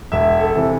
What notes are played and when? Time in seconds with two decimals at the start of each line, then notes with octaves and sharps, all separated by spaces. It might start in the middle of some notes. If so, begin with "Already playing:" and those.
0.12 E1 E5
0.40 A4
0.55 C3 E3